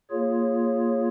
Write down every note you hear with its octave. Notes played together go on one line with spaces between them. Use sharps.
A#3 F4 G#4 C#5